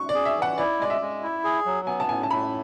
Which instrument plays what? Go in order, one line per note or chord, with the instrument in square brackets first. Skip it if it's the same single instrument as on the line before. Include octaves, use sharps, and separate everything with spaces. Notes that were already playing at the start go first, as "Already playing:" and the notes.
Already playing: [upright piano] C#6
D5
[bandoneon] G#4
[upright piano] E5
[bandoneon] E3
[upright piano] F#5
[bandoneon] E4 [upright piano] D5
[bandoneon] G#3 [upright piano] D5
[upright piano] E5
[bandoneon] G#3
E4
G#4
F#3
[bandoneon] B3 [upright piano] G#5
[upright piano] A5
[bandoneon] A2 [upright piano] G#5
[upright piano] A5
[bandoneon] A2 [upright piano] B5